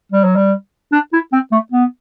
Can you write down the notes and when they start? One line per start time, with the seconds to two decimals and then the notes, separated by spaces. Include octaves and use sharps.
0.12 G3
0.24 F#3
0.36 G3
0.92 D4
1.13 E4
1.32 C4
1.52 A3
1.72 B3